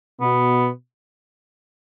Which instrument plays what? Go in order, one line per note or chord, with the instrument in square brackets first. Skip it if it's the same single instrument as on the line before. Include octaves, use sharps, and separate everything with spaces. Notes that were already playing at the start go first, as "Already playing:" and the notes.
[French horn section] B2 [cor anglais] B3